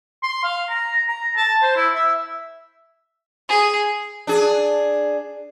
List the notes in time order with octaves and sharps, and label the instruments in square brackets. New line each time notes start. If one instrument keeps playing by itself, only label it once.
[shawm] C6
F5
A#5
A#5
A5
C5
E4
E5
[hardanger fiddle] G#4
[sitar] D4 G#4